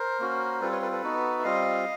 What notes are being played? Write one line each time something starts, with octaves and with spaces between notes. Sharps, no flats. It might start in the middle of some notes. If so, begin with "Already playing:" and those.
Already playing: A#4 C5
A#3 C#4 F#4
G3 C4 F4 A4 B4
B4 C#5
A4 B4
A4 B4
B3 D#4 F#4
E5
G3 C4 F4 D#5 F5